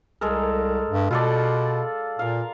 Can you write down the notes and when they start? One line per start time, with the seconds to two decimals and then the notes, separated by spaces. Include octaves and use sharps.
0.21 C2 G#3 A4 A#4
0.89 G2
1.11 B2 F4 A4 D5
2.19 A#2 A#4 F5